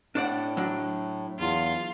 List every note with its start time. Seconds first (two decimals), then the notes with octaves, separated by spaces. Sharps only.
0.15 A2 D4 D5 F#5
0.57 F#3 D4
1.38 E2 F4